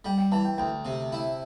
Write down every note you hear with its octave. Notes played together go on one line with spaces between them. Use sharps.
G3 G5
G5
E3 A5
G5
D2 G5
C3
E4